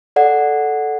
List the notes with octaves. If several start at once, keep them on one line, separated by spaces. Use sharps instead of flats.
A4 D5 F#5